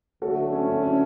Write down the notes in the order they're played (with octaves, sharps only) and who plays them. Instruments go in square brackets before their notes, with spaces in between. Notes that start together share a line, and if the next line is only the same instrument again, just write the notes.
[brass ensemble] D2 D3 F#3 A3 [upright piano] F#4 A4
[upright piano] C#4
C#4
C#4